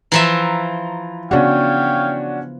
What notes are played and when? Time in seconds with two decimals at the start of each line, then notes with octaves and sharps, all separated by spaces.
0.12 E3 F3 E5 A#5
1.31 C#3 B3 C#4 D4 F#4 C#5 F5 G5